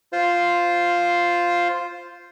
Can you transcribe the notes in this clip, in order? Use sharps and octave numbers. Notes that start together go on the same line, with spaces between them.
F4 C5